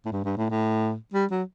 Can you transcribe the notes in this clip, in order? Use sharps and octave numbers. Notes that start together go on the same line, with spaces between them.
A2
G2
G2
A2
A2
G3
F#3